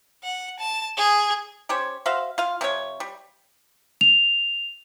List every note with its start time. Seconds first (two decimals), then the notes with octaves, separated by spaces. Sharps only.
0.24 F#5
0.59 A5
0.97 G#4
1.69 C#4 G4 C5 C#5
2.06 F#4 C5 E5 F5
2.38 F4 F5
2.61 C3 F3 C#4 C#5
3.00 G3
4.01 F7